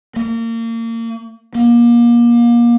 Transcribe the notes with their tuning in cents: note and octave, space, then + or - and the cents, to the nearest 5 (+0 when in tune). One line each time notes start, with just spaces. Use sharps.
A#3 -30
A#3 +30